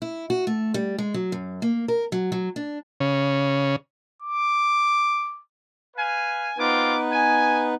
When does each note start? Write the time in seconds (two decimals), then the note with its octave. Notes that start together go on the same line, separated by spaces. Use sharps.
0.02 E4
0.30 F#4
0.47 A3
0.74 G3
0.98 G#3
1.14 F#3
1.32 F#2
1.62 A#3
1.88 A#4
2.12 F#3
2.32 F#3
2.56 D4
3.00 C#3
4.23 D6
5.96 B4 F5 G#5
6.58 B3 C4 D#4 F4 B4 D6
7.10 G#5